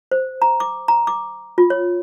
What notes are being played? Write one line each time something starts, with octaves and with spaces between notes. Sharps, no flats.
C5
A#5
D6
A#5
D6
F4
C#5